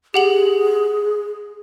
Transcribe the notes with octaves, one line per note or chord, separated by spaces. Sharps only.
G4 G#4 F#5 F#7